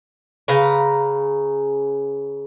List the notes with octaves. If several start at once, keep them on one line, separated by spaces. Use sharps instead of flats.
C#3 B4 F5 A#5